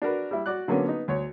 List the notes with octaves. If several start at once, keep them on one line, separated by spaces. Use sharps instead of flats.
D4 F#4 A#4 B4
G3 E4
F#4 D5 F#6
D3 F#3 A#3 B3 C#4
B3 D#4
D2 C#5